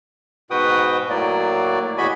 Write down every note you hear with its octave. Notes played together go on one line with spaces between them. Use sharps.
G#2 B2 F#4 B4 G5 D#6
A2 F#3 A#3 D5
E2 A2 F#4 D#5 G#5 B5